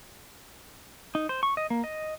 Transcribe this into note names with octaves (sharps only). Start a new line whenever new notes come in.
D#4
C5
C#6
D#5
A#3
D#5